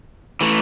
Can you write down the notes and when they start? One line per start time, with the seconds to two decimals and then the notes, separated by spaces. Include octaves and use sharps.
0.41 E3 A3